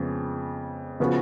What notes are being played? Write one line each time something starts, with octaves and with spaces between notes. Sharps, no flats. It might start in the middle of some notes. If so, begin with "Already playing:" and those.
Already playing: F2 C#3 G#3 B3
C#3 F3 B3 F#4